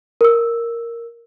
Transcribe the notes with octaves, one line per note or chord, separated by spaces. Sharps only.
A#4 E6